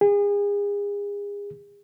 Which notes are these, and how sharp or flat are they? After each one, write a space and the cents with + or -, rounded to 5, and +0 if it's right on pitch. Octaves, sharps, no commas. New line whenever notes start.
G#4 -35